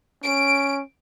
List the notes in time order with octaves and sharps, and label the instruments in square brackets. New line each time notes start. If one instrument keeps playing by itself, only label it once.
[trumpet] C#4 [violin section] D7